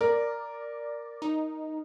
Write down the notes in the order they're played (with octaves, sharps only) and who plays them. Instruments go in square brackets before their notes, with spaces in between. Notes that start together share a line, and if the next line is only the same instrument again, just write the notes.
[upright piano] A#4 [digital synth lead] D5
[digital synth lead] D#4